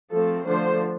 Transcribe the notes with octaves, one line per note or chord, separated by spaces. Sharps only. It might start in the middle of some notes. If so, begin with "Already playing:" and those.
F3 A3 C4 A4
D3 F3 A3 D4 C5